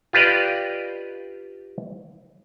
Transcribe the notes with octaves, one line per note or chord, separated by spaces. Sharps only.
F4 G4 B4 D5 D#5